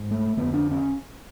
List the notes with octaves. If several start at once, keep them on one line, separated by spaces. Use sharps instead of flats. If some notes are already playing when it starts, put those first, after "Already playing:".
Already playing: G#2
A3
F2 D3 B3
D4
C#4